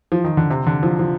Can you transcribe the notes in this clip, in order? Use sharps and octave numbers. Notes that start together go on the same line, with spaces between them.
F3
D#3
D3
C3
D3
F3
F3